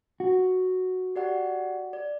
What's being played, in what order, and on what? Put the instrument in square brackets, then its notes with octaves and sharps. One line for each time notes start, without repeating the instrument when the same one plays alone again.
[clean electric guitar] F#4
[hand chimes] G4 D5 F#5
D5